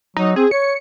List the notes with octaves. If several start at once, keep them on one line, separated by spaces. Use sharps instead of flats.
F#3 D#4
C4 G#4
C#5 C#7